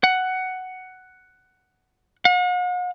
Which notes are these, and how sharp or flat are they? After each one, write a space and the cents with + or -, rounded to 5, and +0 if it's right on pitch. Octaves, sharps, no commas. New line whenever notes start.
F#5 +10
F#5 -45